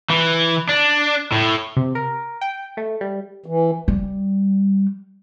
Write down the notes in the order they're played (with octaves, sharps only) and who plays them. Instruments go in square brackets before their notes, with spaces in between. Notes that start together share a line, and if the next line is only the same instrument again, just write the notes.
[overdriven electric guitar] E3
D4
A2
[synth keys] C3
A#4
G5
A3
G3
[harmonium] E3
[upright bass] G3